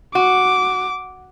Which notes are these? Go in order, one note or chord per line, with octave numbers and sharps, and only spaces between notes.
F#4 D6